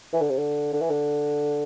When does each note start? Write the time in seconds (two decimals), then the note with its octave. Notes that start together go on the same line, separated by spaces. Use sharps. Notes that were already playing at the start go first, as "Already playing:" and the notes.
0.13 E3
0.21 D3
0.30 C3
0.38 D3
0.73 D3
0.81 E3
0.90 D3